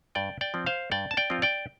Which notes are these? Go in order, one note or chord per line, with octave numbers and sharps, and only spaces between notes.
G2 D5 G5
D5 G5
F3 C4
C5 F5
G2 D5 G5
A5
D5 G5
F3 C4 F4
D5 G5